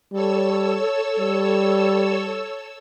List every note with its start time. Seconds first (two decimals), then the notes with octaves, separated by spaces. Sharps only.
0.13 G3 A4 C#5 E6
1.19 G3